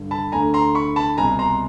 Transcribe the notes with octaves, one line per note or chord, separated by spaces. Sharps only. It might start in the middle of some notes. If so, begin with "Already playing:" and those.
Already playing: G2 D3
A5 B5
D2 D3 G#5 A#5
A#5 C6
B5 C#6
A5 B5
C2 B2 G#5 A#5
A#5 C6